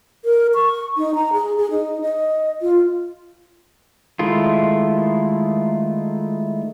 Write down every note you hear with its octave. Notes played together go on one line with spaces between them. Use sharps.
A#4
C#6
D#4
A#5
G#4
G#4
D#4
D#5
F4
D#3 G#3 A3 E4 F4